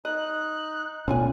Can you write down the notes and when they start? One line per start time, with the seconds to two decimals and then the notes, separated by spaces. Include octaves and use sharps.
0.05 D#4 D#5 F#6
1.08 D2 B2 C#4 F4 D5 G#5